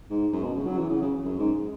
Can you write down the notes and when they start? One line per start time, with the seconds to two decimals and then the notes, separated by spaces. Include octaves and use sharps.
0.10 G#2
0.33 F#2
0.44 B2
0.55 C#3
0.67 F#3
0.78 E3
0.90 C#3
1.01 C#3
1.25 F#2
1.39 G#2